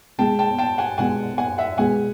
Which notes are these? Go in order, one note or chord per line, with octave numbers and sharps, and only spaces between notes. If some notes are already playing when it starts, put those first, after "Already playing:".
B2 G#3 B3 G5 A5
G5 A5
G5 A5
F#5 G#5
B2 G#3 B3 F#5 G#5
F#5 G#5
E5 F#5
B2 G#3 B3 F#5 G#5